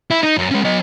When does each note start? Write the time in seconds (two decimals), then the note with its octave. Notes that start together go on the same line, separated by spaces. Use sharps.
0.11 E4
0.23 D#4
0.37 F#2
0.51 G#3 C#4
0.64 F#3 D#5